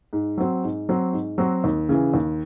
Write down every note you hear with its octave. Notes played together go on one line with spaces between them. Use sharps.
G#2
F#3 C4 F#4
G#2
F#3 C4 F#4
G#2
F#3 C4 F#4
D#2
C#3 E3
D#2